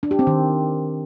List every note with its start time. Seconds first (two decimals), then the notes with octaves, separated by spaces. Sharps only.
0.03 D4
0.11 G4
0.19 C4
0.27 D#3